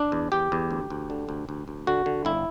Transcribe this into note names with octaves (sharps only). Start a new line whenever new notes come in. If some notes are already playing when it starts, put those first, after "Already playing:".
Already playing: D4
E2
E2 G4
E2
D2
D2
D3
D2
D2
D2
D3 F#4
D3
G1 E4